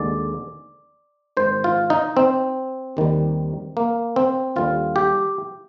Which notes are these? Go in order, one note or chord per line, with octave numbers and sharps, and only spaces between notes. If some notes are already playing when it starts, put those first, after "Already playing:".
Already playing: D#2 D3 G#3 D5
G#1 G#2 D#3 C5
F4
D#4
C4
D#2 D#3 G3
A#3
C4
D#2 D3 G3 F4
G4